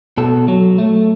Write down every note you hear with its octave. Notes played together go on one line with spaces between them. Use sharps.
B2 A4
F#3
A3